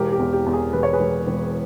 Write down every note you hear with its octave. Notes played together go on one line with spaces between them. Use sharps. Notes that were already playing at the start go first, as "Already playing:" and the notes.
Already playing: E1 G4 A#4
G4
E2
G4
E2
G#4
E1 B4
C#5
G#4 B4
E1
E1